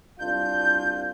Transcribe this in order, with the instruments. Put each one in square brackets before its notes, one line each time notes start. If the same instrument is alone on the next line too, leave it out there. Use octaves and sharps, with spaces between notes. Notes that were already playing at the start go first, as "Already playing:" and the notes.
[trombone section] C2 D4 F4 [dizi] G6